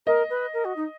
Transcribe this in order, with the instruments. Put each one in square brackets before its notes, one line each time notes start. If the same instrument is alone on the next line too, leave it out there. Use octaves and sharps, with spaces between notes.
[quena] A#4 [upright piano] D#5
[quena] B4
A#4
F#4
D#4